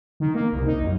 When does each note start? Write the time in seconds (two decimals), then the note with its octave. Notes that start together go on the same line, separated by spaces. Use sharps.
0.20 D#3
0.35 A#3
0.53 C2
0.67 D#4
0.82 F#2